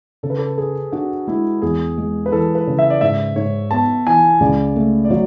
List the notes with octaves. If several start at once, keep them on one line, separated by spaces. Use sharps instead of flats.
C#3 A4
B4
A4
G#4 A4
D4 F#4
G#3 E4
E2 G#4
G#3
B4
E3 A4
B4
C#3
E5
D5
G#2 E5
G#2 C#5
B3 A5
E3 G#5
C#2 D5
A3
D5
F#3 C#5